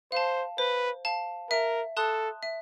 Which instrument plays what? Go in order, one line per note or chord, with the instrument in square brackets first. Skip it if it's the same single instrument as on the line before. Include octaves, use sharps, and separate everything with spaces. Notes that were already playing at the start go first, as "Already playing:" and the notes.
[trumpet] C5 [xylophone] F5 A5
[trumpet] B4 [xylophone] C5
[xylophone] F5 A5
[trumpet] A#4 [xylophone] E5
[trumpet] A4 [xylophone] A5 C6 D#6 F#6
[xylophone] E5